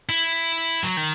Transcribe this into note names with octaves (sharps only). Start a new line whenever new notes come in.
E4
F#3
D#3